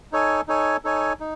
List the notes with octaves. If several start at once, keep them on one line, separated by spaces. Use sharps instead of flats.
D#4 A4 C#5 G#5
D#4 A4 C#5 G#5
D#4 A4 C#5 G#5
D#4